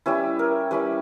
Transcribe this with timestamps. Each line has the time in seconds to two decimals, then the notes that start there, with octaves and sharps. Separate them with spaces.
0.06 G3 C#4 E4 B4
0.39 A#4
0.71 G3 C#4 E4 B4